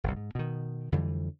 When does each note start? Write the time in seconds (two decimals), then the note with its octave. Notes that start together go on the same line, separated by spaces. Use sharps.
0.04 G1 C2
0.16 G#2
0.35 B2 D#3
0.92 F2 D3 E3 G3